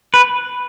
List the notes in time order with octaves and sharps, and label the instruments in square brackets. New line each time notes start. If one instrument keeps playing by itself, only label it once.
[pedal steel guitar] B4